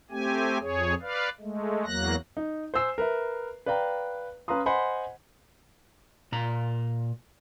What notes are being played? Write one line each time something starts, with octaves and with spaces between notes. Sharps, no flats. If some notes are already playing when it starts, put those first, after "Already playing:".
A3 C4 G4 G#5
F2 G#4 C#5
B4 D5 F5
G#3 A3
E2 F#3 A#3 F#6 A#6
D#4
C5 G#5 E6 C7 E7
A#4 B4 E5
B4 D5 F5 G5 A#5
C#4 B4 F5 A#5 C6 D#6
C5 D#5 F#5 G#5 B5 C6
A#2 A#5